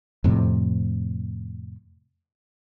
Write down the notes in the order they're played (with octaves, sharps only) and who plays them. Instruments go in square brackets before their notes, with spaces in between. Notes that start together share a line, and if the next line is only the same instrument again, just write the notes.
[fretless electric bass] F2 A2 C3